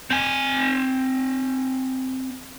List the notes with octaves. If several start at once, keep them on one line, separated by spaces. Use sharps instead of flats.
C4 G#5